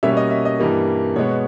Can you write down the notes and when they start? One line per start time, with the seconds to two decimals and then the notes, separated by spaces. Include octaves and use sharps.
0.03 B2 G3 A#3 C#4 E5
0.17 D#5
0.31 E5
0.45 D#5
0.60 G2 E3 G3 A#3
1.16 B2 G#3 B3 C#5